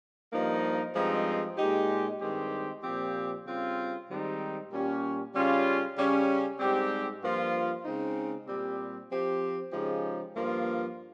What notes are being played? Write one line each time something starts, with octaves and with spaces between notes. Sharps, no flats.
G2 F3 A#3 D#4
G2 F3 G#3 C4 D#4
A#2 G#3 D#4 G4
G2 D#3 G#3 C4 G4
A#2 F3 C4 G4
C#3 G3 C4 F4
G#2 D#3 G3 C4 D#4
A#2 G3 C#4 G4
C#3 G3 C#4 F4
C#3 G3 C#4
G#2 G3 C4 G4
G2 F3 A#3 F4
C#3 G#3 C4 D#4
A#2 G3 C4 G4
F3 C4 G4
C#3 F3 G#3 D#4 G4
G2 F3 A#3 F4